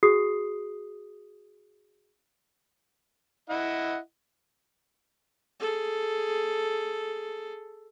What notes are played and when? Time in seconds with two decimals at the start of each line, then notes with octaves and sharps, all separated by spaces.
0.03 F#4 G#4 D#6 C7
3.50 E4 D#5 F#5
5.60 G#4 A4